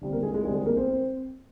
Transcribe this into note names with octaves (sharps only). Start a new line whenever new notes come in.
D3 G3 C4
A#3 A#4
G#3 G#4
G#3 G#4
D3 G3 G#3 C4 G#4
G#3 G#4
A#3 A#4
C4 C5
C4